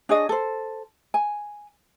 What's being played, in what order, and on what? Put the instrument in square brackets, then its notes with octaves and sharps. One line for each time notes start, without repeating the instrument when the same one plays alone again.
[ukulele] D4 G#4 C#5 D#5
A4 C5
G#5